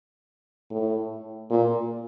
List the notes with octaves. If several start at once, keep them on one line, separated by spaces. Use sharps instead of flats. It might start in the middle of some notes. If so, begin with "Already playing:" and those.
A2
A#2